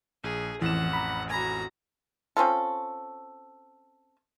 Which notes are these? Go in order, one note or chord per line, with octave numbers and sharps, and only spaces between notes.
A#1 G#4
A1 F2 E3 F#5 E7
A#5 B5
F#4 G#5 A#5 B5
C4 C#4 F4 A4